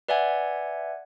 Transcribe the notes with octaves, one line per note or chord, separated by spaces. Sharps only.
B4 D5 E5 F#5 G#5 G#6